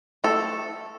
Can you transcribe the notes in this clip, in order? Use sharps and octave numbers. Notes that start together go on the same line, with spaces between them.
A3 A4